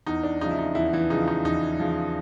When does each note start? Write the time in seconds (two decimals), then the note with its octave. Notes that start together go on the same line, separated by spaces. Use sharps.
0.07 E2 D#4
0.23 D4
0.41 C#3 F3 D#4
0.51 E4
0.59 D#4
0.75 E2 E3 E4
0.93 E3 E4
1.10 C#3 F3 D#4
1.28 D#4
1.45 E2 D#4
1.80 C#3 F3